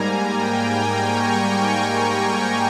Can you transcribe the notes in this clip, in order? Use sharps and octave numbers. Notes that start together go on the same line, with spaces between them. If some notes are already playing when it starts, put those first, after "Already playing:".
Already playing: G#2 G3 A#3 G#5 A#5
G5
G#5
C#6